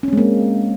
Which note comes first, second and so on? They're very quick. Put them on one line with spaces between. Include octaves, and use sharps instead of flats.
C#4 C4 G#3 A#3